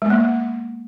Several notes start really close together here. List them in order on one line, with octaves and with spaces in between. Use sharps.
G#3 B3 A#3